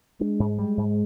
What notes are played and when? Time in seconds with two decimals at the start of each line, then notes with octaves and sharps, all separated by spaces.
0.21 G#3 D4
0.40 G#2
0.59 G3
0.77 G#2